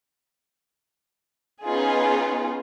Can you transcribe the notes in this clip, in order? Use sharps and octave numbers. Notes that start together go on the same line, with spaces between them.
B3 C#4 D#4 F4 G#4